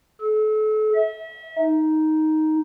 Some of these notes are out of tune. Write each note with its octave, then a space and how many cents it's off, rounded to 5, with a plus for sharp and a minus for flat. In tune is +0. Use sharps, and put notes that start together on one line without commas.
A4 -35
E5 -35
D#4 +5